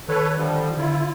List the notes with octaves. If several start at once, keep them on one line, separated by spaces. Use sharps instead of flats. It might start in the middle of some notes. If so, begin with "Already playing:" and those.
D#3 A4 B4 C#5
D3 F3 G3
D3 E4 F4